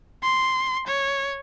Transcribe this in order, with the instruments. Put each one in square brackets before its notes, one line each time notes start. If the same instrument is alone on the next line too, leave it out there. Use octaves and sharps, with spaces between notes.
[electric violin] C6
C#5